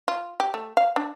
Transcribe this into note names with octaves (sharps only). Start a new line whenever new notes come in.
F4
G4
A3
F5
D4